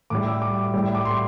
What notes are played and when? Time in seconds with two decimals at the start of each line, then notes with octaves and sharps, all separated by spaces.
0.10 A2 G3 D6
0.26 E6
0.42 D6
0.74 A2 G3
0.95 D6
1.05 C6